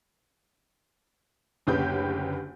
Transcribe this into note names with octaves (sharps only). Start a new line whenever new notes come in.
F#1 D2 C#3 G4 B4 G6